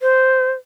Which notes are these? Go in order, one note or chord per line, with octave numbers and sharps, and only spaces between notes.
C5